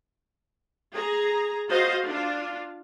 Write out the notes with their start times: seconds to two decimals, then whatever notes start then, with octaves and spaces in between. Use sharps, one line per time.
0.95 G#4 A#5
1.68 F4 F#4 C5 D#5 F5
2.05 D4 F4